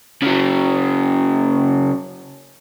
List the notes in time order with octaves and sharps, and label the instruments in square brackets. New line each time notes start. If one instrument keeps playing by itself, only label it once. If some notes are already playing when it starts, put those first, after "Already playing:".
[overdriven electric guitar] C#3 F#3